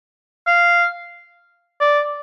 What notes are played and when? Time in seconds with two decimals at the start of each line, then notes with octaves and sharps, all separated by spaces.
0.47 F5
1.81 D5